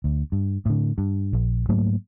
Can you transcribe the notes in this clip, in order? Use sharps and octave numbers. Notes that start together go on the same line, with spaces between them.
D2
G2
A2 D3
G2
A#1
G#2 F#3 A3 A#3